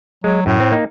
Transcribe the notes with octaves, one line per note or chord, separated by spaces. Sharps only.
F#3 G#3
F#2 A2
C4
A#3 D#4